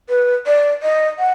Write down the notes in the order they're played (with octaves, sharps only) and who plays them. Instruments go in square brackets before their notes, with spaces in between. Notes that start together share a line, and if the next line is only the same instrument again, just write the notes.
[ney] B4
D5
D#5
F#5